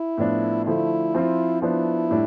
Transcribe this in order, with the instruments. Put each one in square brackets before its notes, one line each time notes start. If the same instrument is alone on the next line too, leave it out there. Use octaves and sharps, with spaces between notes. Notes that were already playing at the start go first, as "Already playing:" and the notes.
Already playing: [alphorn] E4
[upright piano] A2 F3 B3 D4
[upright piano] D3 F3 A3 [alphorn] E4
[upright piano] F3 C4 F4
[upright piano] F3 B3 D4 [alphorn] E4
[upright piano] A2 G3 D4 G4